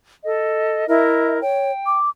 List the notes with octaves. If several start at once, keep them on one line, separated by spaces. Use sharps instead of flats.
A4 D#5
E4 A#4 D#5 E5
C#5 G5
D6